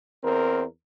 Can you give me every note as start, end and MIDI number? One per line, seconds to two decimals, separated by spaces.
0.23 0.64 40
0.23 0.64 60
0.23 0.64 70